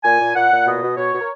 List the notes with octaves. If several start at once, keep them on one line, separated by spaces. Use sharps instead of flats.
A#2 G#5
A#2
A#2 F#5
A#2
B2 D#5
B2
B2 C#5
B2
A#4